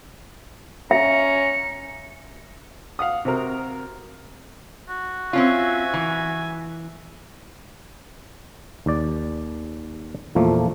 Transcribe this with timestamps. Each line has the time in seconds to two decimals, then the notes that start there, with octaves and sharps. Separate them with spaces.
0.91 C#4 E5 A#5 C#7
2.99 F5 F#5 D#6
3.25 C3 C4 F#4 A#4
4.89 F#4
5.33 C4 C#4 F4 E5 G#5
5.94 E3
8.86 D#2 D5
10.35 E2 A#2 F3 A3 A#3